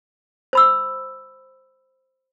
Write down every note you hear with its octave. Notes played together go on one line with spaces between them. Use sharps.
C5 B5 E6